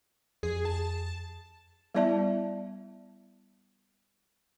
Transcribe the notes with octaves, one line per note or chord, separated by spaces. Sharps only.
F2 G#4
A5
G3 B3 E4 D5 E5 A5